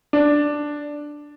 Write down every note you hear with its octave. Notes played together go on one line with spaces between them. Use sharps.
D4